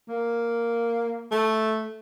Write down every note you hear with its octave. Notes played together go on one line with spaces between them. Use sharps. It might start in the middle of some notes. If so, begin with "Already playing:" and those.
A#3
A3